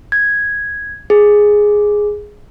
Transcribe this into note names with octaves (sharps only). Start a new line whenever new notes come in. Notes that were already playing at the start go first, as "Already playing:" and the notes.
G#6
G#4